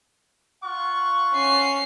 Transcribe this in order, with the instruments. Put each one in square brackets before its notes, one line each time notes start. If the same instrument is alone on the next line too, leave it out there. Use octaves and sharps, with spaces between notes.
[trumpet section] F4 F#5 C#6
[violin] C#4 C7